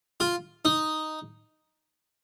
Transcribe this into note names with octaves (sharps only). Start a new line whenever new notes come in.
F4
D#4